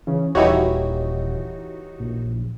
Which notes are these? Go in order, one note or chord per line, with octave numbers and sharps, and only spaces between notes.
C#3 E3
D#1 E3 D#4 E4 F#4 G4 C#5
A#1